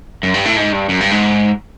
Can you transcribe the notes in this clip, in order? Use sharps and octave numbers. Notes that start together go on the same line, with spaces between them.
F#2
G2
A2
G#2
G2
F#2
G2
G#2